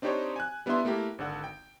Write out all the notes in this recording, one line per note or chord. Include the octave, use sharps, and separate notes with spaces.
C4 D4 D#4 G4 C5 C#5
G#5 F#6
G3 B3 D4 E4 E5 C6
A3 A#3 E4 G4 A#4
G#1 D3 A4 F#5
G5